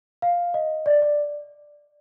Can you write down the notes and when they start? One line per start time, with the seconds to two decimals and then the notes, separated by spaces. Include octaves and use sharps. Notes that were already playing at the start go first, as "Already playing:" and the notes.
0.22 F5
0.54 D#5
0.86 D5
1.02 D5